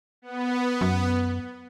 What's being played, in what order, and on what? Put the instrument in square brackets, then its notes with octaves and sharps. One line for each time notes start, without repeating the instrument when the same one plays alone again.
[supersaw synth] B3
[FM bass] F#2